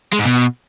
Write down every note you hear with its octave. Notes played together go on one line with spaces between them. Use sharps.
G#3
G#2
B2